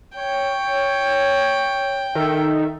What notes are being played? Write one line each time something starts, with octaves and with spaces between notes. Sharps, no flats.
C#5 G5
D#3 A4 E5